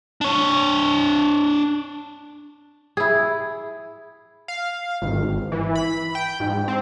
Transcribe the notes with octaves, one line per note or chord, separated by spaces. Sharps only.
D4 C#5
E4 G#4
F5
G#1
E3
B5
G5
G#2
C4